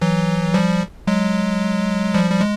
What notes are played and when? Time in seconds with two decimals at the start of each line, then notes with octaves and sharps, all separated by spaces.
0.02 E3 F#3
0.54 F3 G3
1.07 F#3 G#3
2.14 F3 G3
2.31 G3
2.41 G#3